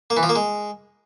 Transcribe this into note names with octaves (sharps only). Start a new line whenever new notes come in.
A#3
E3
F3
A#3
G#3